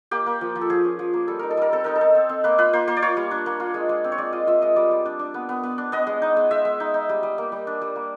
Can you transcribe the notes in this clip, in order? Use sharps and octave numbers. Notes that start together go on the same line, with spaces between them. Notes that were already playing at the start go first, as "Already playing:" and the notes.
A#3 G4
A#3
F3
F3
A4
F3 G#4
C#4
F3
A#3
G3 A4
D#4 A#4
A4
G3 A#4
C4 A4
D#4 A#4
A4
D#4
C4
C4
A#3 B4
F4 B4
A#3 C5
A#3 C5
D5
F4 C#5
G3
D4
A#3
F4
G#3
G#3
C4
C#5
G#3 D5
F4 D#5
F4 E5
G#3 D#5
G3 D5
G3
D4
D4
B3
B3
B3
D4
B3 D#5
G#3
D#4
G#3
G#3 E5
G#3
D#4
D#4
G3
G3
A#3
G3
D4
G3
A#3